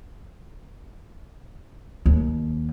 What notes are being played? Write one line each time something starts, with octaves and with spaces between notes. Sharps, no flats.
D#2